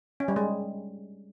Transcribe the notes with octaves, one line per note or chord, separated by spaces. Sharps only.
C#4
G3
G#3